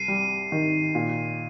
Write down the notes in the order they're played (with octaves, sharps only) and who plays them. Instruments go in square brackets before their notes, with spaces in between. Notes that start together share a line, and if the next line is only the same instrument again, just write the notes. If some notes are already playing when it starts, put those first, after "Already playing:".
Already playing: [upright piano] C2 [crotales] C7 D#7
[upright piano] G3
D#3
A#2